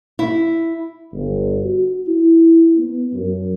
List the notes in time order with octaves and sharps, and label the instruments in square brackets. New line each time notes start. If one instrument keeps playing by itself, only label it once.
[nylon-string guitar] E4
[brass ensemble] G1
F#4
E4
B3
F#2